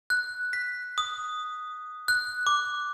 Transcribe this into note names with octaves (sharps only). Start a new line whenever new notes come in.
F#6
B6
D#6
F#6
D6